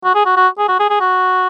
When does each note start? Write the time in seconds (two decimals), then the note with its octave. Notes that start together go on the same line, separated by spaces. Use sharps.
0.04 F#4
0.15 G#4
0.25 F#4
0.36 F#4
0.58 G#4
0.68 F#4
0.79 G#4
0.90 G#4
1.00 F#4